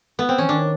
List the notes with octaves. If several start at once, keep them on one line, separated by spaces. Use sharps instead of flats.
B3
C4
E3 C#4
D#3 D4